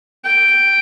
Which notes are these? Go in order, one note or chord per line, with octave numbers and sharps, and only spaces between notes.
G5